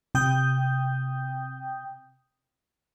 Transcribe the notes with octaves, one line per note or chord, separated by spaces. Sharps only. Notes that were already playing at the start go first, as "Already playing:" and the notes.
C3 G5 D#6 G6